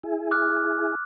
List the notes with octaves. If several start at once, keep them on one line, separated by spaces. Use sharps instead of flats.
E4 G#4
D6 F6 F#6